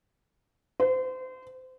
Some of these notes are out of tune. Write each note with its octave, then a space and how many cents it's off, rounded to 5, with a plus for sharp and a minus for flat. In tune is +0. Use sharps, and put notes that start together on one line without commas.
C5 -30